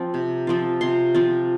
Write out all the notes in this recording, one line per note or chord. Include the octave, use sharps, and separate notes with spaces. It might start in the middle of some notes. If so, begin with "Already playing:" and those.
Already playing: F3 C4 F4
C3
F3 C4 F4
C3 C6
F3 C4 F4